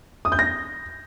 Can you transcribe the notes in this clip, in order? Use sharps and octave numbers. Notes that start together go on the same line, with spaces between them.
D#6
G6
A#6